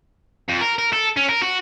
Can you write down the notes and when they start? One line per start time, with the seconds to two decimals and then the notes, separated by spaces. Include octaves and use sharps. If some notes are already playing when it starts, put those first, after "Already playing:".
0.49 F2
0.61 A#4
0.78 A#4
0.93 A4
1.16 C#4
1.29 A#4
1.42 F#4